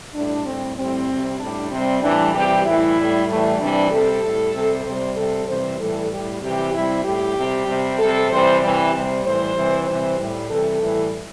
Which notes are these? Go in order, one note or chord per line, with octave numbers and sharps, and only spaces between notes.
A2 G3 D4
A2 G3 C4
A2 G3 C4
C3 G3
A2 G3 D4
C3 G3 C4
A2 E3 G3 D4
C3 E3 G3 G4
A2 E3 G3 E4
A2 G3
A2 E3 G3 A3
C3 E3 G3 D4
C3 G3 A4
A2 G3
C3 G3
C3 G3 C5
C3 G3 A4
C3 E3 G3 C5
A2 E3 G3 A4
A2 G3 G4
C3 E3 G3 G4
C3 G3 E4
A2 G3 G4
C3 G3
C3 G3
C3 G3 A4
C3 E3 G3 C5
C3 E3 G3
C3 G3 C5
A2 E3 G3 C5
C3 E3 G3
C3 E3 G3 C5
A2 G3
C3 E3 G3 A4
A2 E3 G3